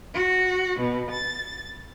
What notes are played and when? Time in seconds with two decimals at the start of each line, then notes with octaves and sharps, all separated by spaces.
0.15 F#4
0.80 B2
1.12 A6